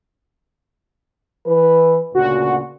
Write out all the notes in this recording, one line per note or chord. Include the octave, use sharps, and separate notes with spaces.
E3 B4
D2 A#2 C#3 F#4